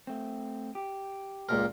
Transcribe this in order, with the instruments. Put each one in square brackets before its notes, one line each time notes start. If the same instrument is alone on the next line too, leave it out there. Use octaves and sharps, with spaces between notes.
[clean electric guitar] A3 C4
G4
[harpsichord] C#2 A#2 A#4